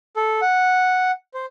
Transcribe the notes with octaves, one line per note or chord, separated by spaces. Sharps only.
A4
F#5
C5